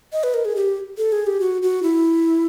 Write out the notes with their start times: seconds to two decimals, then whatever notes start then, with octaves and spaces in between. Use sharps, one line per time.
0.13 D#5
0.24 B4
0.34 A#4
0.45 G#4
0.56 G4
0.98 A4
1.12 G#4
1.27 G4
1.40 F#4
1.62 F#4
1.83 E4